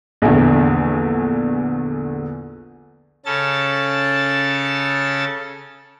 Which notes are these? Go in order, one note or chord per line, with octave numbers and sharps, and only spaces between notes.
A#1 E2 D3
C#3 C#4 A4 A5 A6